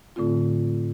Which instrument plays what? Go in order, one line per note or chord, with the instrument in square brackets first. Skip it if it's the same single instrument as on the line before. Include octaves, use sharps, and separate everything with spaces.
[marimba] A2 D3 A3 C4 F4